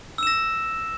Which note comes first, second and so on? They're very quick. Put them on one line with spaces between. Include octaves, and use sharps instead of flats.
E6 E7 A#6